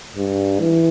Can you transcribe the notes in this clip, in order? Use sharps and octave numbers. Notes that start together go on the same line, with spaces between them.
G2
E3